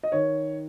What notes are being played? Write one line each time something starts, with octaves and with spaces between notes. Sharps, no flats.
D#5
D#3 C#5